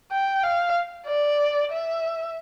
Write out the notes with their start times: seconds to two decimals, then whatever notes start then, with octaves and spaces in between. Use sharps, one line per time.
0.12 G5
0.43 F5
1.07 D5
1.71 E5